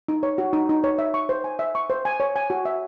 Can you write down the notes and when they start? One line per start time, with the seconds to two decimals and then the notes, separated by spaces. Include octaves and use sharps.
0.08 D#4
0.23 C#5
0.38 F#4
0.53 D#4
0.69 D#4
0.84 C#5
0.99 E5
1.14 C#6
1.29 C5
1.44 G#5
1.59 E5
1.75 C#6
1.90 C5
2.05 G#5
2.20 C#5
2.36 G#5
2.50 F#4
2.65 E5